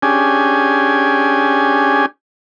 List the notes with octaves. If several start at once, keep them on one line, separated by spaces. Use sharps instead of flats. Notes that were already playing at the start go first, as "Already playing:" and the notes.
C#4 D4 G4 G#4 G#5